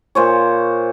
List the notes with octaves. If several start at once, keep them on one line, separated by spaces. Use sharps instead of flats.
A#2 C5 C#5